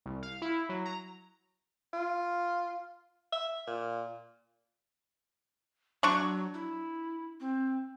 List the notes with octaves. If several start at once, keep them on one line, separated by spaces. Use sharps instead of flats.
C2
F5
E4
F#3
A#5
F4
E5
A#2
F#3 D4 C#6
E4
C4